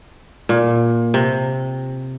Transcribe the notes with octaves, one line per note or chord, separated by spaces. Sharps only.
A#2
C3